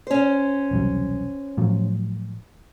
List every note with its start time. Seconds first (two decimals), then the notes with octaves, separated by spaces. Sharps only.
0.07 C#4 C5
0.71 E1 C2 F#3
1.57 A2 F3 F#3